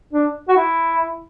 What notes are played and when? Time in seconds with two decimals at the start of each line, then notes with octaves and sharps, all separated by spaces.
0.13 D4
0.48 F#4
0.56 E4